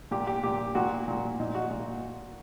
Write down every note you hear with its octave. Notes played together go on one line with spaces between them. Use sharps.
A#2 G4
G4
A#2 G4
A#2 F#4
A#2
A#2 D#4
F#4
A#2